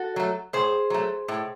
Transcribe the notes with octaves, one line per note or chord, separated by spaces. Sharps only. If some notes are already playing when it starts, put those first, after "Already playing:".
Already playing: F#4 A4
F#3 A3
A2 G#4 C5
F#3 A3
A2